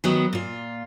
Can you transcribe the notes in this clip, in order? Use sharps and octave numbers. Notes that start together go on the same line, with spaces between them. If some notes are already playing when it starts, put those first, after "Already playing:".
D#3 F#3 B3
A#2 F4